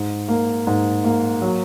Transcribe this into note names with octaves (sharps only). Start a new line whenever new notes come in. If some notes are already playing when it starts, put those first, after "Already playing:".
Already playing: G#2
A#3
G#2
A#3
F#3